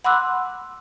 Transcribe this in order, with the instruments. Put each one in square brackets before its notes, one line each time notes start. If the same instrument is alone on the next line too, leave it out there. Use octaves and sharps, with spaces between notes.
[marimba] F#5 B5 C6 D6 E6 F#6